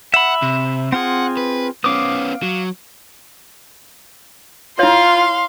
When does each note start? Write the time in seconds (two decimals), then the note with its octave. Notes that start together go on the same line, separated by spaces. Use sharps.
0.14 E5 F#5 B5
0.42 C3
0.92 C4 F4 G#4 F#5
1.37 B4
1.84 B3 C#4 F5 D6 D#6
2.42 F#3
4.79 E4 F4 C#5 F5 C6